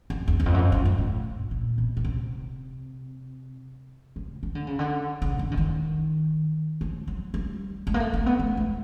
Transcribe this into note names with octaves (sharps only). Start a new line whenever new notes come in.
F2
E2
E2
F2
F#2
F2
F#2
G#2
A2
A#2
B2
B2
C3
C#3
D#3
D3
C#3
D3
C#3
D#3
D3
D#3
F3
F#3
G3
G#3
A#3
A3
A#3
B3
A3
G#3